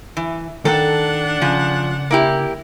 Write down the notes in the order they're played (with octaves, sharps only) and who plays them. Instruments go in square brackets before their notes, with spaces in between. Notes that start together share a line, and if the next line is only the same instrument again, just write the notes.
[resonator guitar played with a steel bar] E3
[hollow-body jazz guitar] D#3 [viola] D4 F#5 [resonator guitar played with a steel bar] A4
[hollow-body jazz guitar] C#3 [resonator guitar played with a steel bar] F3
[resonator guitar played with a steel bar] A#3 E4 G4